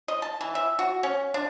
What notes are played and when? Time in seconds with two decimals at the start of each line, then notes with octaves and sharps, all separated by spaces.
0.08 D#5
0.22 A5
0.41 E3
0.55 E5
0.79 F#4
1.03 C#4
1.34 D4